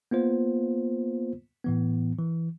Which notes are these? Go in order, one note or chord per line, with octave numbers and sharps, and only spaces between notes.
A#3 B3 F4 C5
A2 E3 B3
E3